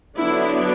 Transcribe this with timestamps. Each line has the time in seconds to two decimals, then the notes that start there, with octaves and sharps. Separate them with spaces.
0.17 D3 F#3 B3 D4 E4